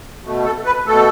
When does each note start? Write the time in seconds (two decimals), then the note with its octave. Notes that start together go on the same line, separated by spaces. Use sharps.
0.24 B2 A3
0.45 A4
0.65 B4
0.86 B2 A3 A4